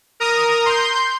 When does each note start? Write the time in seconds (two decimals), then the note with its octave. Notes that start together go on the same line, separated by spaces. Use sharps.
0.20 A#4 A#5 D#6
0.66 C6 G6